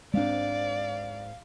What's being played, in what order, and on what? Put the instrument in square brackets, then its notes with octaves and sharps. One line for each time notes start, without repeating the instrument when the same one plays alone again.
[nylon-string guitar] G#2 B3 C4 [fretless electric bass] G#3 D4 [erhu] D5 [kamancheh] F5